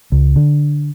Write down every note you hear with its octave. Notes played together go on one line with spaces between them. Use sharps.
C#2
D3